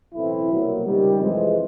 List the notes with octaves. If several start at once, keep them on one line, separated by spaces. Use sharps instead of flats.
B1 A2 E3 A3 C4 E4
C2 B2 F#3 A#3
C#2 C3 D#3 G3
F2 C3 E3 G#3